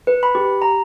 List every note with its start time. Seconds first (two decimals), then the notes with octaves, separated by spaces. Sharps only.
0.07 B4
0.23 B5
0.35 G4
0.62 A#5